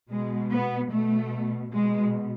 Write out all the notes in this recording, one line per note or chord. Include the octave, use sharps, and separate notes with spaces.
B2 G#3
B3
B2 A3
B2 G#3